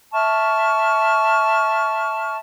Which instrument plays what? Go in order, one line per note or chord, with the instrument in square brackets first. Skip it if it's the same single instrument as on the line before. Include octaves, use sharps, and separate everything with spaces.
[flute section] E5 A5 C#6 F6